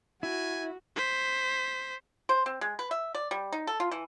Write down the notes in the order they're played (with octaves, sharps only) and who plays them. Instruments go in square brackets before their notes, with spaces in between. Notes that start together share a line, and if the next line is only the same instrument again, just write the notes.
[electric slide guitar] E4 [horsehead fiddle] F#4 [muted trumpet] G#5
[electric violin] C5 B6
[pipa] C5
C4
G#3
B4
E5
D5
G3
D#4
A4
F4
E3